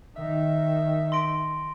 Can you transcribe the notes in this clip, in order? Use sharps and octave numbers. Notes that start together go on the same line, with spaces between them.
D#3 E5
C6 A#6 D7